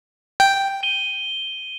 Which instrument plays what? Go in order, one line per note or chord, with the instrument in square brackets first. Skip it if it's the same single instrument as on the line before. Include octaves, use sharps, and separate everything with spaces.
[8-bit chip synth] G5
[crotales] D#7 G7